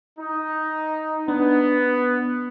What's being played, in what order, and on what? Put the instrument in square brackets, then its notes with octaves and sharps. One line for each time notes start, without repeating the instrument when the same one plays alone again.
[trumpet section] D#4
[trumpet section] B3 [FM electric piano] D4